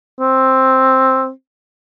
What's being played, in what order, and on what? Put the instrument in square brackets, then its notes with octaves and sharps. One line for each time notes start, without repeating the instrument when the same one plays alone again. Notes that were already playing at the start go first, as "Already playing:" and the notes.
[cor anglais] C4